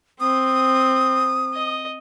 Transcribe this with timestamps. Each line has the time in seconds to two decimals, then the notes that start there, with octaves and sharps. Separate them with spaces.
0.20 C4 D#6
1.54 D#5